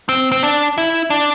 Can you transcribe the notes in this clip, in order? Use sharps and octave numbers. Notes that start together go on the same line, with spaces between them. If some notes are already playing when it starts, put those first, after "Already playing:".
C4
C4
D4
E4
D4